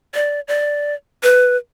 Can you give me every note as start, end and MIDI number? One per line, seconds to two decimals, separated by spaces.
0.14 0.40 74
0.48 0.94 74
1.23 1.57 71